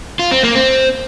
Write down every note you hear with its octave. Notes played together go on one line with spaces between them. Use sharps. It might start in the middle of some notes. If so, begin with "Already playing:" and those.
F4
C4
A#3
C4